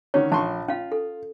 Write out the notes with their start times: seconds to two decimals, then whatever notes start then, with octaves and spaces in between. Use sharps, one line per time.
0.14 D3 D#3 C#4 C#5
0.32 A#1 A5 C6 C#6
0.68 C#4 F4 F5
0.92 A4